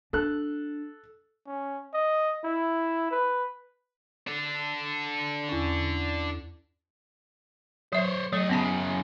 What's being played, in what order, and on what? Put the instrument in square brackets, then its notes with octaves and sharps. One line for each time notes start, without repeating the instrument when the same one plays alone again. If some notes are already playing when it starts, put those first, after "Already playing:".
[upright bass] D4 [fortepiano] A4 F#6
[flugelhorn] C#4
D#5
E4
B4
[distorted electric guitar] D4 A4
[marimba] E2 C#4
[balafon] F#3 E5 [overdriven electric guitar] C5 C#5
[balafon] F#3 [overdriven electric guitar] A3 D#5
[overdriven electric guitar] F#2 C#3 [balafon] B3 C#4 A5